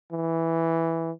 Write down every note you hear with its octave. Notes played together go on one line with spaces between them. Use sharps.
E3